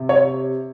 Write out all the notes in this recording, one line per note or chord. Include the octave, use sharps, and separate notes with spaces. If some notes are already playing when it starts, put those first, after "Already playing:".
Already playing: C3
C#5